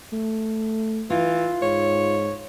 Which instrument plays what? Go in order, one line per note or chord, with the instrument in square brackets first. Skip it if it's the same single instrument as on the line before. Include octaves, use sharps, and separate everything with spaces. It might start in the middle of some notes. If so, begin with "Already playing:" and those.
[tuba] A3
[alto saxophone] E3 [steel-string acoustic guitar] F4
[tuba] G#2 [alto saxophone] C#5